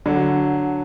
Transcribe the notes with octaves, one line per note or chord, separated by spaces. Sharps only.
D3 F#3